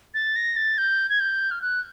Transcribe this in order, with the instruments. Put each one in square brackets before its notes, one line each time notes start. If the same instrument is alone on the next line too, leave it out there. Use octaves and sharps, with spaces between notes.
[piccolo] A6
A#6
A6
G6
G#6
G6
F6
F#6